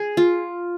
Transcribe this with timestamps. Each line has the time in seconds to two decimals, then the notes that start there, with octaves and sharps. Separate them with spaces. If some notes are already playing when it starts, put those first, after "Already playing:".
Already playing: G#4
0.17 F4